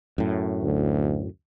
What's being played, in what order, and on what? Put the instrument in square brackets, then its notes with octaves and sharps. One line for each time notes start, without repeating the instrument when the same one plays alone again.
[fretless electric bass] F#2 A2
[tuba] D2